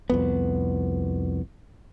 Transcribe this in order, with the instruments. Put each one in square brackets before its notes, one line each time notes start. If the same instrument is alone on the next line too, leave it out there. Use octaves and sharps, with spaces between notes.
[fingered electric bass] C2 F2 B3